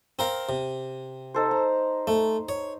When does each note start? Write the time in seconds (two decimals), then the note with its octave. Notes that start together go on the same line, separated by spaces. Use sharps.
0.19 C4 A#4 F5
0.49 C3
1.34 D#4 A4 C5
1.51 A#5
2.07 A3
2.49 C#5